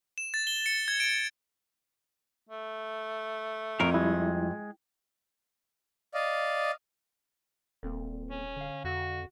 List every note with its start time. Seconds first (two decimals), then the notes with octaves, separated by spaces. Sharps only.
0.18 E7
0.34 A6
0.47 G7
0.66 C#7
0.88 G#6
1.00 D7
2.49 A3
3.80 F2 A2 A#4
3.94 G3 G#3 E4
6.14 D5 D#5 F5
7.83 D#1 A#3 C4 A4
8.30 C#4
8.56 D3 F5
8.84 F2 F#4